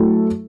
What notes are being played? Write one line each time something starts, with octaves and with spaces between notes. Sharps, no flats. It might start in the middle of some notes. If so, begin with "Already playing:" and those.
Already playing: F#3 A3 E4 A4